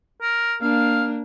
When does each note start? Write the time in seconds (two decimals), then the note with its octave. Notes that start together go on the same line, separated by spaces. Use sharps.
0.21 A#4
0.62 A#3 D4 F5